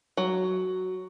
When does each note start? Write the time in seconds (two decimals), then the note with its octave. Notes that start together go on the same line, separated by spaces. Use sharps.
0.17 F#3